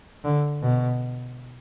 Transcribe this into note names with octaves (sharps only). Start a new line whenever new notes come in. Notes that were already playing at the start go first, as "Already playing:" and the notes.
D3
B2